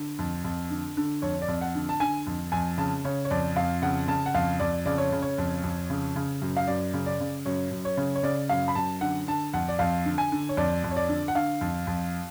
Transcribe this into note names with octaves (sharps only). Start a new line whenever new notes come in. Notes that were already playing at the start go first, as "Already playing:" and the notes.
Already playing: D3
F2
F2
D3
D3
F2 C#5
D5
F2
F#5
D3
A5
D3 G#5
F2
F2 G#5
C#3 A5
C#3 C#5
C#5
F2 D5
F2 F5
C#3 F#5
C#3 A5
F#5
F2 F5
F2 D5
C#3 D5
C#5
C#3
C#5
F2
F2
C#3
C#3
F#2
F5
F#2 D5
C#3
D5
C#3
F#2 C#5
F#2
C#5
C#3
C#5
C#3 D5
F#2 F5
B5
F#2 A5
D3 F#5
D3 A5
F2 F#5
D5
F2 F5
D3
G#5
D3
C#5
F2 D5
F2
C#5
D5
D3
F#5
D3 F5
F2
F2